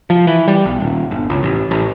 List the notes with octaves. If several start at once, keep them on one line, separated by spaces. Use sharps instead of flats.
F3
E3
G3
B1
D#1
G1
C#2
A1
A1